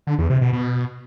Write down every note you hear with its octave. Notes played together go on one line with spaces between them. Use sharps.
D3
E2
C3
B2
B2